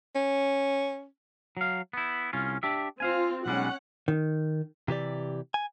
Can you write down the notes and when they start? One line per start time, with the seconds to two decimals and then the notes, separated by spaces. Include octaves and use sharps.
0.15 C#4
1.57 F#3 F5
1.93 B3 E4
2.33 C2 C#4 F4
2.63 D4 G4 E5
3.00 C4 F4 C5 F5 G#5
3.46 B1 G3 G#3 C#4 F#5
4.08 D#3
4.88 C3 E3 G4 D5
5.54 G#5